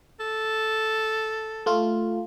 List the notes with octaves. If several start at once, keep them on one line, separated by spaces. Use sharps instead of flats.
A4
A3 F4